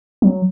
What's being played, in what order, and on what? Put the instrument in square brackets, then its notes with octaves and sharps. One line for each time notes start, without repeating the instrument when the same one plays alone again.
[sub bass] F#3